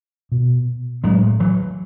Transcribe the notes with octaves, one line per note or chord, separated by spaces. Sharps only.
B2
A2 F#3 G#3
E3 F#3